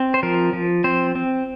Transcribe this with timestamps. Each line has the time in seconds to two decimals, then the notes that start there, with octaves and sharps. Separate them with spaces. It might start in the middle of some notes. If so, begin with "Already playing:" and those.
Already playing: C4
0.14 C5
0.23 F3 A#4
0.53 F3
0.84 C4 C5
1.15 C4